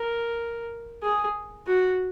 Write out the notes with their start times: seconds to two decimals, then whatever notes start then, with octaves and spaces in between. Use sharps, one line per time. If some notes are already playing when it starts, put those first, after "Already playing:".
Already playing: A#4
1.03 G#4
1.67 F#4